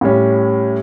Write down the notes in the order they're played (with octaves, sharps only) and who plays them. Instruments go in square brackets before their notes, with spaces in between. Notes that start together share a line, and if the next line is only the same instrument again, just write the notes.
[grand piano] A2 G3 C#4